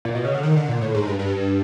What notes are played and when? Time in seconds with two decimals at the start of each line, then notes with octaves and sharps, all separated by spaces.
0.05 A#2
0.15 B2
0.25 C#3
0.34 D3
0.43 D#3
0.56 D3
0.68 A#2
0.81 A2
0.95 G#2
1.07 G2
1.19 G2